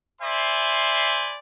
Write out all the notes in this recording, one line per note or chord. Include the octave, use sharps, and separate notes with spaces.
C5 D5 E5 G#5 B5 C6